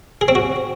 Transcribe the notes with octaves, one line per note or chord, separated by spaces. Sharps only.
G#4
C4
F#4